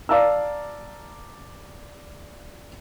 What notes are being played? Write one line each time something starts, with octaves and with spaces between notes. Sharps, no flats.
D5 F5 A5 A#5 E6